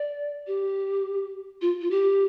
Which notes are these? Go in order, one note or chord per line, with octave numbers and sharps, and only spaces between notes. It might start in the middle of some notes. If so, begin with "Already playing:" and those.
Already playing: D5
G4
F4
F4
G4